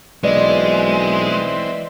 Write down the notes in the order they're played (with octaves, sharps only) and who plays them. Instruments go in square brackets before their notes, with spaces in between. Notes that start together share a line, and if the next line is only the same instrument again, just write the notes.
[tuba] B1 [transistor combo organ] E3 C4 [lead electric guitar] G#3 [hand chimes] B4 D5 D#5